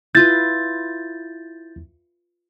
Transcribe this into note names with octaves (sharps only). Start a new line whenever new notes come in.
E4 F4 B4 G6 A6